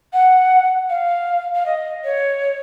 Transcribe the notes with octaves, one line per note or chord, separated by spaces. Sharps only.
F#5
F5
F5
D#5
C#5